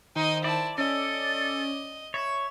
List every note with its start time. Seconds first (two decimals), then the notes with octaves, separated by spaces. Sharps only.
0.16 D#3 D#4 C5 D#5 G5
0.44 E4 D5 A5
0.78 C#4 A4 D5 D#5
2.14 C#5 E5 B5 E7